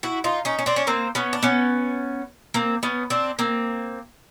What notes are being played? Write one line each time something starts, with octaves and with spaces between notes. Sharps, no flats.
E4 F#4
D#4 F4
C#4 D#4
C#4
C4 D4
C#4
A#3 C4
B3 C#4
D4
B3 C#4
A#3 C4
B3 C#4
C4 D4
A#3 C4